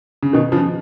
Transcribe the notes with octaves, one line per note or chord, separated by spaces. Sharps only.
C#3
B2 D#3
C#3 F3